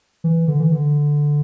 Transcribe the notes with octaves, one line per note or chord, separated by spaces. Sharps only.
E3
D3
E3
D3